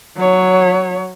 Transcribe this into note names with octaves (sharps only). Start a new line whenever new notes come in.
F#3 C#5